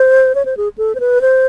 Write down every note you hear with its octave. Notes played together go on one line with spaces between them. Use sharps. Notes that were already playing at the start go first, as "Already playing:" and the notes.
Already playing: C5
C#5
C5
G#4
A4
C5
B4
C5